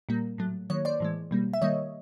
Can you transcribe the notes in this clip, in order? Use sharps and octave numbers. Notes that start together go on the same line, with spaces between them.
A#2 G3 A#3
A2 F#3 A3
D#3 F#3 A#3 C#5
C5 D5
A2 E3 G#3
B2 G3 A#3
E5
D#3 G3 A#3 C#5 D#5